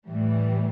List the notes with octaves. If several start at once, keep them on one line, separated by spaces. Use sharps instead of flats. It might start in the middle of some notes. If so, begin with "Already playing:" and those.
A2 E3 G3